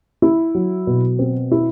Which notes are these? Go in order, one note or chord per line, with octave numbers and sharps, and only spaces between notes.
E4
F#3
B2
C4
E4